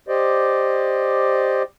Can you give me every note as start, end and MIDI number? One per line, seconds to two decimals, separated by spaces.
0.08 1.63 67
0.08 1.63 72
0.08 1.63 74
0.08 1.63 75